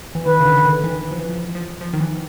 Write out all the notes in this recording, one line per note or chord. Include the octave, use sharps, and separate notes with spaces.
E3
D#3 B4
C#3
D3
D3
D#3
E3
E3
F3
E3
F3
F3
F3
D#3
E3